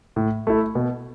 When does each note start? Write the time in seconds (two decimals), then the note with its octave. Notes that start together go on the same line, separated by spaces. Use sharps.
0.16 A2
0.47 A3 E4
0.75 B2